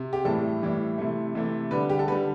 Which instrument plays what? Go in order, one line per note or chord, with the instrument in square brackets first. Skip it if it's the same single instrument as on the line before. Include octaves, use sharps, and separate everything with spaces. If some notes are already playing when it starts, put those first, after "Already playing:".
Already playing: [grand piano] C3
G4
A2 E3 G3 A4
A2 E3 G3
C3 E3 A3
C3 E3 A3
D3 G3 B4
G4
A4
D3 B4
G3